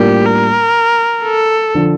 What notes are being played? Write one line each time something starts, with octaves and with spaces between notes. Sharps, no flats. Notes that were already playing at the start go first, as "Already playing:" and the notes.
Already playing: A2 G3 A#3 D4 F4 G4
A#4
A4
D3 F3